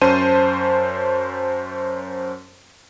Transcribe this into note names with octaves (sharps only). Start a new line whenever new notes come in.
F#2 C#4 C5 A5 D#7